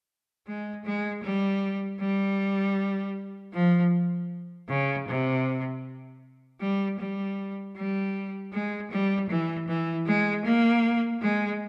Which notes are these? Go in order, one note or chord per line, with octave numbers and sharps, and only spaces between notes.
G#3
G#3
G3
G3
F3
C#3
C3
G3
G3
G3
G#3
G3
E3
E3
G#3
A#3
G#3